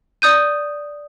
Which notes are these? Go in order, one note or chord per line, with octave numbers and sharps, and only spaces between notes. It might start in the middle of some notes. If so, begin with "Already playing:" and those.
D5 D#6 G6 D#7